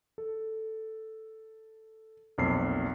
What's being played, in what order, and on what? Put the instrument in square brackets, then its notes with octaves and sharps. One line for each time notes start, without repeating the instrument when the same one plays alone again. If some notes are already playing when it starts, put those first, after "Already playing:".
[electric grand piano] A4
B1 F2 A#2 C7